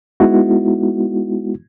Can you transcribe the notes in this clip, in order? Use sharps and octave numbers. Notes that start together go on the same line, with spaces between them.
G#3 B3 D#4 E4 F#4